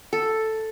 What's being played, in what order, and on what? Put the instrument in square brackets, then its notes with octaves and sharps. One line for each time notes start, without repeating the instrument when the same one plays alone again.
[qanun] A4